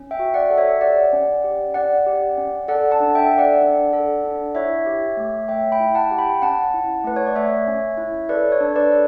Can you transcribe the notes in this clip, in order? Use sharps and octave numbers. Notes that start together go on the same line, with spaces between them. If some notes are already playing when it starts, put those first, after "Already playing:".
Already playing: C#4
E5 G5
F#4
D5 F#5
A4
C#5 E5
G4 D5 F#5
C#4
G4
C#4 D5 F#5
G4
C#4
A4 D5 F#5
F#5 A5
D4
E5 G5
A4
D5 F#5
D4
A4
D4
E4 C#5 E5
G4
A3
A3 E5 G5
G5 B5
E4
F#5 A5
G4
G5 B5
C#4 F#5 A5
E4
A3 B4
C#5
D5
A3 C#5 E5
C#4
E4
A4 B4 D5
C#5
D4
B4 D5
A4